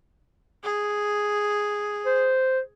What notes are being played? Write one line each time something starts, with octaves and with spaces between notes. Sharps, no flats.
G#4
C5